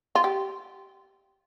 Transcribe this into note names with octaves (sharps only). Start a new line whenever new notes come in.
F4
G4